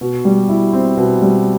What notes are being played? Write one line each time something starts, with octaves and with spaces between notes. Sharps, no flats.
B2
G3
E4
C4
B2
G3